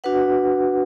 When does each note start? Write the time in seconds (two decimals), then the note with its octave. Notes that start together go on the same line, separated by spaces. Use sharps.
0.04 D4 F#4 B4 F#5